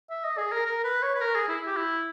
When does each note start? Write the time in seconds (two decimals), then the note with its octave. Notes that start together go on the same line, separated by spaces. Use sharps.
0.10 E5
0.24 D#5
0.38 G#4
0.52 A#4
0.65 A#4
0.84 B4
1.03 C#5
1.15 B4
1.21 A#4
1.35 G#4
1.49 E4
1.66 G4
1.76 E4